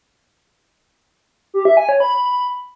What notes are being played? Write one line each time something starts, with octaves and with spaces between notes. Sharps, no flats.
G4
E5
G#5
C#5
B5